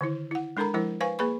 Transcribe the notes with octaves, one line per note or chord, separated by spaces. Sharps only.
D3 D#3 E4
E4 F#5
G#3 D4 A4 A#4 A#5 B5
F3 G#3 E4 A#4 C5
B4 C5 F5 G#5 C#6
A#3 G#4 B4 B5 C#6